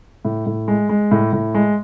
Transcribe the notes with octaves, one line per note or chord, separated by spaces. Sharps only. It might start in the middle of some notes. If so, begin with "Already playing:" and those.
A2
A2
G#3
G#3
A2
A2
G#3